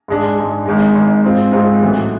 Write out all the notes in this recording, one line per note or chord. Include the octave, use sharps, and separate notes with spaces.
G#2 G#3 D4
G#2 G#3 D4
G#1 G#2 G#3
G#1 G#2 G#3
G#2 G#3 C4 F4
G#2 G#3 C4 F4
B1 A2 E3 B3